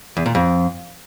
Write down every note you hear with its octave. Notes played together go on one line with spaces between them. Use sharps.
E2
A#2
F2